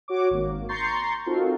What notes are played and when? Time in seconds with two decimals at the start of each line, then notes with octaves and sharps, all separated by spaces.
0.08 F#4 C#5 D6
0.31 G#1 A#3
0.69 A#5 C6 C#6 G6 A6 C7
1.26 C4 D#4 F4 F#4 A4 A#4